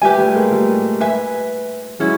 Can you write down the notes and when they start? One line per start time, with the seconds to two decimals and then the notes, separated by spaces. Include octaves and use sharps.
0.02 G3 G4 B4 E5 G#5
0.18 G3 A3
0.35 G#3 A#3
0.51 G3 A3
1.00 B4 E5 G#5
1.99 F#3 G#3 C#4 E4